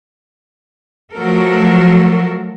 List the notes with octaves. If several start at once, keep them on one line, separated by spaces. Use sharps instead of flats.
F3 F#3 A3 F#4 A4 A#4